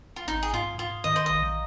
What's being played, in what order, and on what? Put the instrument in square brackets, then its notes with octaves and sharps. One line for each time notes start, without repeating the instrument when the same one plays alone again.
[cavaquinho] F4
[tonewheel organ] G#1 [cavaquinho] D#4
[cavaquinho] G#4
[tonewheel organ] G#2 [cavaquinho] F4
[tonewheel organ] G#2 [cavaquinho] F4
[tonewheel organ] D#3 [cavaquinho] D#5
[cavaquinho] C5
[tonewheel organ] A#1 [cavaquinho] D#5